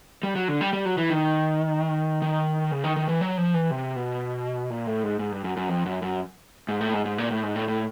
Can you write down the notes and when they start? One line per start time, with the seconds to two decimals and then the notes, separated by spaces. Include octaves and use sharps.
0.23 G3
0.36 F#3
0.48 D3
0.61 G3
0.73 G3
0.85 F#3
0.98 E3
1.10 D#3
2.22 D#3
2.71 C#3
2.84 D#3
2.96 D#3
3.09 E3
3.21 F#3
3.38 F3
3.54 E3
3.71 C3
3.96 B2
4.70 A#2
4.87 A2
5.03 G#2
5.19 G#2
5.32 G2
5.44 F#2
5.57 F#2
5.69 F2
5.86 F#2
6.02 F#2
6.69 G#2
6.81 A2
6.93 G#2
7.05 G#2
7.18 A#2
7.31 A2
7.43 G#2
7.56 A2
7.68 A2